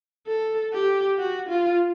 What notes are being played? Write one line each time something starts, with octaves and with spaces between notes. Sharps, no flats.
A4
G4
F#4
F4